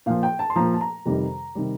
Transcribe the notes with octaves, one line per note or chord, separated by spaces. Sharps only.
A#2 F3 F5
G5
A5
C6
A#2 F3 A#5
A5
A#5
F2 C3 D#3 G3
C3 D#3 G3